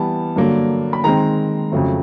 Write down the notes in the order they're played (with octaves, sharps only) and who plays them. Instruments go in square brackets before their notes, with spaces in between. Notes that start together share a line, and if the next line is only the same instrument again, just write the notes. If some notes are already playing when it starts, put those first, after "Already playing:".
Already playing: [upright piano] E3 G3 B3 A5
G2 D3 F#3 A#3
B5
D#3 G#3 C4 A#5
F2 C#3 F#3 A3